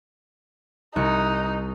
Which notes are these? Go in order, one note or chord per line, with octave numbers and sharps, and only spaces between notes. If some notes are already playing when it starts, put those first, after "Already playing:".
C2 D#4 F#6 C#7